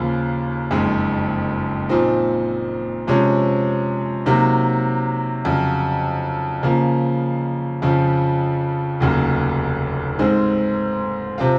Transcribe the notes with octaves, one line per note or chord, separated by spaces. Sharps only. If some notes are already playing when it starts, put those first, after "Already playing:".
Already playing: D#2 C#3 F3 A#3
F#1 F2 D#3 G#3
A#2 F3 C4 D#4
C3 F3 G#3 C#4
C3 D#3 F#3 A#3
F2 C#3 F#3
C#3 F3 A#3
F2 C#3 F3
F1 D#2 C#3 F#3
G#2 D#3 G#3 C4
C3 F3 C4 F4